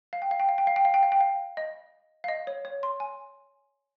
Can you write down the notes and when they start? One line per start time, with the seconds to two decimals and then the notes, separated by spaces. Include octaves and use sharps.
0.13 F5
0.22 G5
0.31 F5
0.40 G5
0.49 F5
0.58 G5
0.67 F5
0.76 G5
0.85 F5
0.94 G5
1.03 F5
1.12 G5
1.21 F5
1.57 D#5
2.24 F5
2.28 D#5
2.47 C#5
2.65 C#5
2.83 C6
3.00 G#5